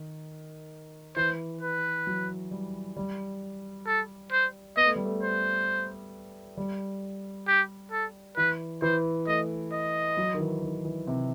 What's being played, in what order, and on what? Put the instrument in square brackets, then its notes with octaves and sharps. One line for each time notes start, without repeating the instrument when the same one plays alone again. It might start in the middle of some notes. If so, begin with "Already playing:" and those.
Already playing: [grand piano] D#3
[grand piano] E3 [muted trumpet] C5
[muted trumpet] B4
[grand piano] F#3
G3
G3
[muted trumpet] A4
C5
[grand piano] B3 [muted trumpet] D#5
[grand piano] A3
G3
A3
[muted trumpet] C5
[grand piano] G3
[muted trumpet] G4
A4
[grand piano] E3 [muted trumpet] B4
[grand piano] E3 [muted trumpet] C5
[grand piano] A3 [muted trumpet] D#5
[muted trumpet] D#5
[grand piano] F#3
D#3
E3
D#3
E3
C3